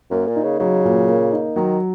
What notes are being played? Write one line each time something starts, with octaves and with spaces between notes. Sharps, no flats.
F#2 A#3
A#2
D#4
C#3
C#3 F#3
A#2
A#3
D#4
D#3 F#3